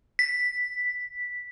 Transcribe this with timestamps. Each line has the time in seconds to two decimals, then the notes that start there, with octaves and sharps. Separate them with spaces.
0.19 B6